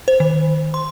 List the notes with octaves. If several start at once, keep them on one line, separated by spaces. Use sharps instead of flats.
C5
D#3
C6